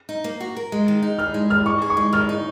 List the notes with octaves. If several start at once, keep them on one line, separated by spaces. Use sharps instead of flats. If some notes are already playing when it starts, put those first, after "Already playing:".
D#4
A#3
F#4
A#4
G#3
D#3
D#4
G#4 F6
G#3
D#3 F6
D#4 C#6
G#4
C#6
G#3
D#3 F6
D#4